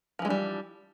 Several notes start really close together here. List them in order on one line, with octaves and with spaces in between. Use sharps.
F3 E3 G#3 D4 G3